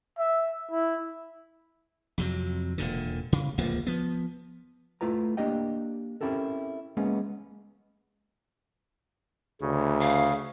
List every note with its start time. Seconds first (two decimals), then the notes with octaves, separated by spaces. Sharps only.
0.18 E5
0.71 E4
2.18 F2 C3 F#3
2.78 E1 A#2 D3
3.33 C#3
3.58 D1 C#2 F3 A#3
3.87 F3 B3
5.01 A3 E4 F4 B4 A#5
5.37 A#3 D4 G4 D#5 G5
6.21 C4 C#4 E4 G4 A4 A#4
6.97 G#3 A#3 B3 C#4
9.61 D2 C#3
10.01 F5